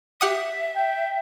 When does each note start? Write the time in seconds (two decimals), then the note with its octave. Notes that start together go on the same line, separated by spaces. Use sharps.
0.21 G4 E5 F#5 D#6
0.76 G5